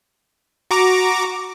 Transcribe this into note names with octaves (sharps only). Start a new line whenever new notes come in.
F#4 A#5 D6